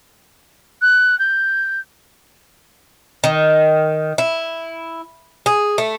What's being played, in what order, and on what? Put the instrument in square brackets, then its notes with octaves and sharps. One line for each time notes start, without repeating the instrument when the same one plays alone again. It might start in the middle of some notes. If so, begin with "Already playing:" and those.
[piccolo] F#6
G6
[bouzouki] D#3
E4
G#4
A3